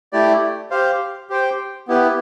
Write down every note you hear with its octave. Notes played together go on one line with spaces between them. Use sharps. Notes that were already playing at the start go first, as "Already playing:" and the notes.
A3 E4 G4 D5
G4 C5 F5
G4 C5 G5
B3 E4 G4 B4